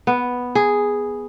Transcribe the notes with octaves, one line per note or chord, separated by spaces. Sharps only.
B3
G#4